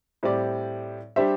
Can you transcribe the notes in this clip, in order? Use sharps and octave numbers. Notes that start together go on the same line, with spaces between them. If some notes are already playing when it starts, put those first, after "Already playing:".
A2 G3 C4 G4 D5
G3 D4 G4 C5 E5